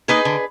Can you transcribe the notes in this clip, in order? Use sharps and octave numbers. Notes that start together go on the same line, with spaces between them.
A#3 D#4 G#4 B4
D3